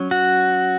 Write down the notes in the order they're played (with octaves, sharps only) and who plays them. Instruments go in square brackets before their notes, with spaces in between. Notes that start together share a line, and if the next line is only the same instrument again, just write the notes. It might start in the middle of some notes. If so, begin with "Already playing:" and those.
Already playing: [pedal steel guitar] F#3 C#4
F#4